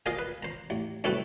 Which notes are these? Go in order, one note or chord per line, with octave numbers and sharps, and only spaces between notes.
F4 A#4 C5 D#5 G#5
B4
C5 A#5
A1
C2 F#2 A3 C4 B4 A5